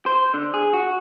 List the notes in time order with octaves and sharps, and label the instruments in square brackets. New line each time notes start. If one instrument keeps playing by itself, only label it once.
[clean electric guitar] C5
D3
G#4
F#4